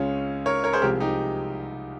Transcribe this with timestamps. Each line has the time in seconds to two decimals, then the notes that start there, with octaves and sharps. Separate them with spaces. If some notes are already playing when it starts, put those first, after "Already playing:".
Already playing: C#2 C#3 G#3 C#4 F4
0.46 A#4 C#5
0.64 A#4 C#5
0.73 G#4 C5
0.82 C2 C3 F3 G#3 G4 A#4
1.00 D#4 G4